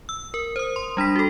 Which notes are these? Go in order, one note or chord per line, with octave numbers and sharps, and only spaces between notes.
E6
A#4
C5 D#6
C6
G3 D4 B5 B6
F#4 A4